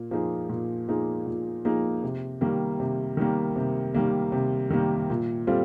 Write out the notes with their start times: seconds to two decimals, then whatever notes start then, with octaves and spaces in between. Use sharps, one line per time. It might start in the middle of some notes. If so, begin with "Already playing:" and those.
Already playing: A#2 A#3
0.11 F3 A#3 D#4 G#4
0.49 A#2
0.88 F3 A#3 D#4 G#4
1.26 A#2
1.65 F3 A#3 D#4 G#4
2.03 C3
2.41 D#3 G3 A#3
2.80 C3
3.17 D#3 G3 A#3
3.56 C3
3.94 D#3 G3 A#3
4.32 C3
4.70 D#3 G3 A#3
5.10 A#2
5.47 G3 C4 F4 A4